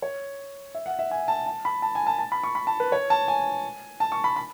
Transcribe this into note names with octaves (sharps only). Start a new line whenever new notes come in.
C#5
E5
F#5
E5
G#5
A5
A5
B5
A5
G#5
A5
A5
B5
C#6
B5
A5
B4
C#5
A5
G#5
A5
C#6
B5
B5